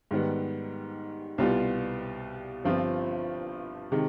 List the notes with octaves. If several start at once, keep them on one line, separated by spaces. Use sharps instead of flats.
G#2 D#3 G3 B3
C2 B2 G3 B3 F4
G1 G2 F3 C4 F4
C3 D#3 G#3